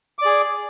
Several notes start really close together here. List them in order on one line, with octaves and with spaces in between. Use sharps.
D6 D5 G#4